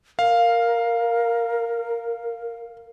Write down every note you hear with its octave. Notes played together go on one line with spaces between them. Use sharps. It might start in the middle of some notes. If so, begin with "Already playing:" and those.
A#4 F5